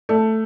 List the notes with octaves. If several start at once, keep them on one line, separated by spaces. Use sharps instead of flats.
A3